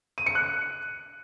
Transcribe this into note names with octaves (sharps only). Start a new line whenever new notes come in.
D#7
C#7
F#6